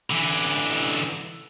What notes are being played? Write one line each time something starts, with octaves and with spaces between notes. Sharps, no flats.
D3 E3